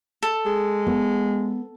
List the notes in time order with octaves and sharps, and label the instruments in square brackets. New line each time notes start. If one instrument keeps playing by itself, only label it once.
[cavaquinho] A4
[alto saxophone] G#3
[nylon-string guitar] B3